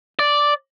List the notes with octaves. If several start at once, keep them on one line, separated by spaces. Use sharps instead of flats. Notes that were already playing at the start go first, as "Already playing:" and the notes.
D5